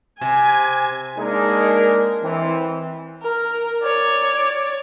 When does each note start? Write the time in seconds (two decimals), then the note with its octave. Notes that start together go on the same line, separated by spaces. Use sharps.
0.21 C3 G#5
1.18 G#3 A#3 D4 D#4 G#4 A#4
2.22 E3 C4
3.22 A#4
3.83 C#5 D5